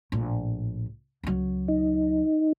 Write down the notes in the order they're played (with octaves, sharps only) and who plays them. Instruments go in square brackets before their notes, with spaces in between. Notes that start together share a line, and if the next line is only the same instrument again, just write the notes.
[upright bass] A#1 A2
C#2 F#3
[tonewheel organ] D#4